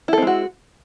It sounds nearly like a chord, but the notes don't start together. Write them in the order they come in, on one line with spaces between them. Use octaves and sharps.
E4 A4 C4 G#3 F#4